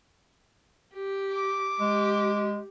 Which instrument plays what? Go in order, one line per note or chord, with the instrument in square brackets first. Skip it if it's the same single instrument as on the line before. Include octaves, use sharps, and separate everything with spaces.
[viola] G4
[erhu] D6
[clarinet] G#3 [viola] G4